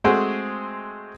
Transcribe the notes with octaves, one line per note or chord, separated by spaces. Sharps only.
G#3 A3 C4 F#4 G#4 C5